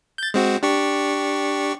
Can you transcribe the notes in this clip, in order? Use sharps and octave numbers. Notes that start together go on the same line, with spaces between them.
G6 A6
G#3 C4 F#4
D4 G4 C#6